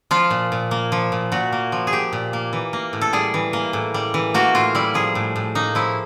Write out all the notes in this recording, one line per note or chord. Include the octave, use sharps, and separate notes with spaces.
F3 F4
A#2
A#2
A#3
F3
A#2
A#2 F#4
A#3
F3
G#4
A#2 G4
A#2
A#3
E3
A#3
A2
A4
G3 G#4
E3
A#3
A2
G3
E3
A#3 F#4
A2 F4
G3 E4
F3 G#4
A2
A2
A#3 D#4
F3 E4